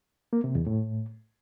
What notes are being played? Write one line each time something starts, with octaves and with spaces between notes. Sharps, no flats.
A#3
C3
E2
A2